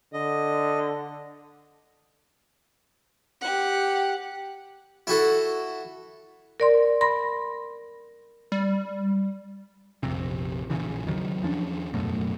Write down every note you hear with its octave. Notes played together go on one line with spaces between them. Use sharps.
D3 D#5
G4 F#5
E4 F#4 A4
A#4 D5 C6
B5 C6 A#6
G3
A#1 F2 C3
A#1 C#3 E3
E2 D#3 F#3
E2 F3 C#4 D4
D1 F#2 B2 A3